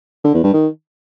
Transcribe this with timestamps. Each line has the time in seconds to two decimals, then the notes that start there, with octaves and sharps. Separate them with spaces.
0.24 D3
0.34 E2
0.44 G2
0.53 D#3